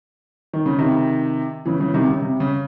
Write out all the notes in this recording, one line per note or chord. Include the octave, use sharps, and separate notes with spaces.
D#3
C#3
C3 D#3
C#3 E3
C#3 E3
C3 D#3
C#3
C3
C#3